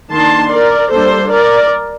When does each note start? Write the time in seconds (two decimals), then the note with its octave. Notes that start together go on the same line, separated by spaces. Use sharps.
0.12 D#3 A#3 D4 A5 C6
0.53 A#4 D5
0.92 G3 A#3 D4 A4 C5
1.32 A#4 D5